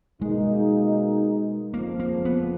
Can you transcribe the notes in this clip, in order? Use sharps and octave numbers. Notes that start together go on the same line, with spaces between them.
B2 G#3 A#3 D#4 G#4
F2 C#3 F3 A#3
A#3
B3